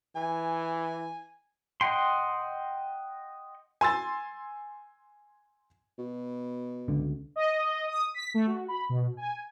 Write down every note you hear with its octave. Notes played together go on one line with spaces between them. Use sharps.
E3 G#5
D#5 F#5 G5 C6
G#5 C6 E6 A6
B2
C#2 D3
D#5
D#6
B6
A3
F#4
B5
B2
G#5